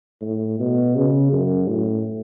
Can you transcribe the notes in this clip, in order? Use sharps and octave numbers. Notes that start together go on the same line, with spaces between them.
A2
B2
C#3
F#2
A2